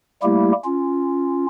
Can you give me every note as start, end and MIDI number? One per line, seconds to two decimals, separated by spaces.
0.23 0.52 55
0.23 0.52 57
0.23 0.52 58
0.23 0.52 64
0.23 0.52 67
0.64 1.46 61
0.64 1.46 65